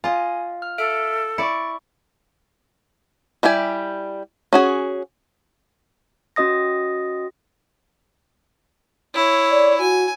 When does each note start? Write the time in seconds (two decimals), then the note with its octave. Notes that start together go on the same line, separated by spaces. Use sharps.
0.04 F4 D#5 G#5
0.62 F6
0.78 A4 E5 F6 D7
1.38 E4 D5 C#6 C#7
3.43 G3 E4 G4 G#5
4.53 C#4 F#4 G#4
6.36 C#4 F#4 D#5 D#6 A#6
9.14 E4 C#5
9.51 D5
9.80 F#4 G#5